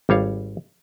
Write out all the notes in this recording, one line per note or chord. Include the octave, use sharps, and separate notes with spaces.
G#1 G3 C#5 F5